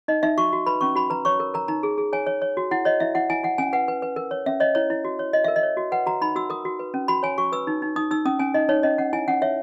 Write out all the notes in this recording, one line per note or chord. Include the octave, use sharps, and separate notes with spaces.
D#4 D#5
D#4 E5
F#4 C#6
F#4
B4 B5
C#4 C#6
F#4 B5
B4 A#5
C#5 C#6
A#4
A#4 A#5
D#4 A#5
G#4
G#4
C#5 G#5
C#5
C#5
F#4
E4 F#5
C#5 D#5
E4 E5
E4 F#5
E4 G#5
E4 F#5
C#4 G#5
B4 F#5
B4
B4
A#4
C#5
C#4 E5
C#5 D#5
E4 C#5
E4
F#4
C#5
C#5 D#5
A#4 E5
D#5
C#5
F#4
B4 F#5
F#4 A#5
D#4 B5
F#4 E6
A#4 D#6
F#4
B4
C#4
F#4 B5
C#5 G#5
F#4 C#6
B4 E6
D#4
D#4
D#4 D#6
D#4 E6
C#4 D#6
C#4 G#5
D#4 D#5
D#4 C#5
C#4 D#5
C#4 F#5
E4 G#5
C#4 F#5
C#5 E5